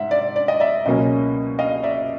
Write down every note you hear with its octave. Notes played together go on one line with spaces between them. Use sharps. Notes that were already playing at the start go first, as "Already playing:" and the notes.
Already playing: G#2 E5 F#5
D5
D5
D#5
D5 E5
C#2 B2 F#3 A#3 C#4 D#5
D#5 F5
D5 E5